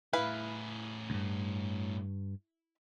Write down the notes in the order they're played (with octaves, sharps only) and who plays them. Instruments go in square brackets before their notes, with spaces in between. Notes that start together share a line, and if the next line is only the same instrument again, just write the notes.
[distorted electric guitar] A2 G#4 [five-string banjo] E4 B4 F5
[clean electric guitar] C#2 G2